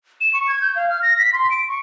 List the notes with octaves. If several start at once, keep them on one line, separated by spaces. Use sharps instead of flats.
E7
C#6
G#6
G6
F5
F6
A#6
B6
C6
D7
C#6